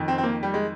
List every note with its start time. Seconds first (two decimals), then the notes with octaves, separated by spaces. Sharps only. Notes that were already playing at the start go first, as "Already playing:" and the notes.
Already playing: F2 D#3
0.08 C4
0.18 C4
0.23 A#3
0.43 G3
0.54 G#3